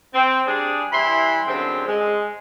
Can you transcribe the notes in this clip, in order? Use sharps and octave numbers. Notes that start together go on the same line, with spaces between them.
C4
G3 D4 G#4
E3 G3 E4 B5 C6
F#2 D3 G3 G#3 C4
G#3